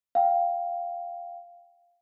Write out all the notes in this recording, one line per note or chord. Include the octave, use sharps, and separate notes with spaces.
F5 G5